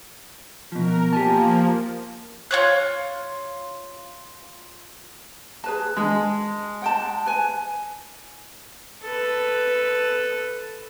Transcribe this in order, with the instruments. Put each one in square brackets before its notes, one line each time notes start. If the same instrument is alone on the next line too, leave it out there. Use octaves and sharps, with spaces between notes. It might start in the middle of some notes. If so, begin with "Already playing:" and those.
[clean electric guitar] B2 F3 [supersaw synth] A#4
[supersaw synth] F3 A#3 [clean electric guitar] G4 G#5 A5
[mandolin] F4 C#5 F#6
[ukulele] G#4 B4 A5
[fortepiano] G#3
[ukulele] F#5 G5 A5
B4 G#5
[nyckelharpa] A4 B4